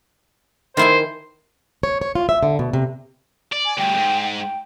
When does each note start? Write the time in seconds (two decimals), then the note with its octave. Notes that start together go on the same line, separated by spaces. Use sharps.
0.77 D#3 E4 C5 G#5
1.83 C#5
2.01 C#5
2.15 F4
2.29 E5
2.43 D3
2.59 B2
2.73 C3
3.52 D5
3.65 G#5
3.78 D2 G2 G5
3.93 E2 G#2
4.40 G5